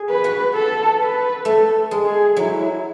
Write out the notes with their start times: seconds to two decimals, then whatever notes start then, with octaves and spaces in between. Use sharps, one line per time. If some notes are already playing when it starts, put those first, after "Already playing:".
Already playing: G#4
0.09 B4
0.24 F#4
0.55 A4
1.00 B4
1.45 A3 A4
1.91 G#3
2.05 G#4
2.37 F#3 E4